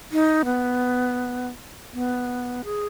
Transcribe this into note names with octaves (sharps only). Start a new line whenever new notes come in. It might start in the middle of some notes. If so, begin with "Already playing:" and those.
D#4
B3
B3
G#4